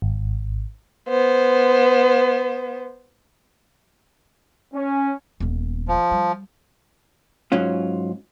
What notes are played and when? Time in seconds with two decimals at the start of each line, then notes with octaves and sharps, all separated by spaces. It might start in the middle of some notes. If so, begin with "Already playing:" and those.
0.02 G#1
1.09 B3 C5
4.74 C#4
5.40 D#1 B3
5.88 F3
6.11 G3
7.52 G#2 F#3 C#4 F4